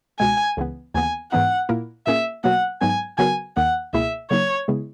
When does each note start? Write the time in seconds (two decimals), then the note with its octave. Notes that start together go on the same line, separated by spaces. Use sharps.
0.19 C#2 B2 G#3 G#5
0.57 C#2 C#3 E3 B3
0.94 D#2 C#3 E3 B3 G#5
1.31 G#2 E3 B3 D#4 F#5
1.69 A#2 A#3 E4 A#4
2.06 A#2 A#3 C#4 G#4 E5
2.44 B2 F#3 A#3 F#5
2.81 G#2 F#3 B3 G#5
3.18 C#3 F#3 B3 F#4 A#4 G#5
3.56 D#2 D#3 A#3 F#5
3.93 C#2 B2 A#3 E4 G#4 E5
4.30 C#3 F#3 A#3 D#4 C#5
4.68 C#3 G#3 B3 E4 G#4